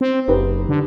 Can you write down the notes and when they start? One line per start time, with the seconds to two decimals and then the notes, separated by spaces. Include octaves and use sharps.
0.01 C4
0.28 F#1 D#4 G4 B4
0.69 D3